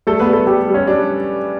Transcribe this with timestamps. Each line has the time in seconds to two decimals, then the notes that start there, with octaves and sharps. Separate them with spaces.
0.07 G3 A3 A4
0.20 B3 B4
0.27 G3
0.33 A3 A4
0.47 G3 G4
0.67 G3
0.74 C#4
0.87 G3 D4